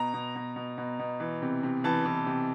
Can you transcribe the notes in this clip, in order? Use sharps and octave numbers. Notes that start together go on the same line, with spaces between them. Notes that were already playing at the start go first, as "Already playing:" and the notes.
Already playing: B2 A#5
B2
B2
B2
B2
B2
E3
C3
C3
E3 A5
E3
C3